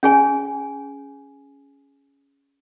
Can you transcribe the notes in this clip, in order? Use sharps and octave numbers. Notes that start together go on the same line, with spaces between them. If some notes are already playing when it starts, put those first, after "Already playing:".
C#4 G#4 G#5